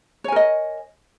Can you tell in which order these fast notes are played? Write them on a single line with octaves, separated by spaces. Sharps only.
C#5 G#5 A#4 D#5